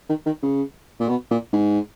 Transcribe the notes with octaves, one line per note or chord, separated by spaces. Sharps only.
D#3
D#3
C#3
A#2
B2
A#2
G#2